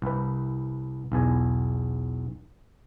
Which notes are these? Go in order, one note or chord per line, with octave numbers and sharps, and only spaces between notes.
C2 B4
B1 E2 G#5